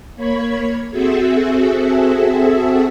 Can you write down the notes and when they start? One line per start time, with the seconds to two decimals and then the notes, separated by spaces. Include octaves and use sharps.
0.16 A#3 C#5 B5 G#6
0.90 C4 F#4 G#4 A4 E5